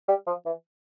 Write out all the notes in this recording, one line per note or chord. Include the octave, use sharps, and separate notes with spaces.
G3
F3
E3